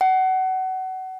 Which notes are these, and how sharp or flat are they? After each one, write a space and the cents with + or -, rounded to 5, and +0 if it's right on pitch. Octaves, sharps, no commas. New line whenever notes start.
F#5 +25